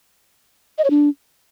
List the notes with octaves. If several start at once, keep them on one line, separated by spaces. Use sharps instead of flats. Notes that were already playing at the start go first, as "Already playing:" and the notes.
D#5
C#5
D4